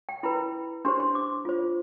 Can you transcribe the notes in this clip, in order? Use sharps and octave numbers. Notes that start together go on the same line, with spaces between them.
G5
E4 B4 B5
D4 G4 C5 C6
C6
D6
F4 C5